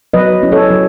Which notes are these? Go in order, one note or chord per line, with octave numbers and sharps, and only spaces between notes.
F#3 B4 D#5
C#4 E4
A4 C#5
F#3